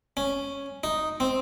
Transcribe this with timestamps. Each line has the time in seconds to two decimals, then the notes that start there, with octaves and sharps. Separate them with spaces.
0.17 C#4
0.84 D#4
1.20 C4